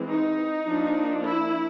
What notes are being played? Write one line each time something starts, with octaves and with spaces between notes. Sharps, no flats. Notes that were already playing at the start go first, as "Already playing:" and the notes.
Already playing: E3 G#3 C4
D#4
F3 A#3 D4
E4